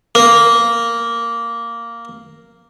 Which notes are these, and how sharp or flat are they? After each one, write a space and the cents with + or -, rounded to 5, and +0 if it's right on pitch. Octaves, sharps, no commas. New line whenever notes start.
A#3 -5